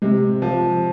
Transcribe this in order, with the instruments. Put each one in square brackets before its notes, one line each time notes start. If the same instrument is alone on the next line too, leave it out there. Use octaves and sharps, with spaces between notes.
[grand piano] C3 [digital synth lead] G#3
[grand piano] F3